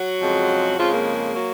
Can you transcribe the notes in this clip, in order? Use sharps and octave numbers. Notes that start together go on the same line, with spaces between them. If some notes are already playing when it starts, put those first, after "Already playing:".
Already playing: F#3 F#4
F2 C#3 G#3
F2 C#3 F3 G#3 F4
A#3
F#3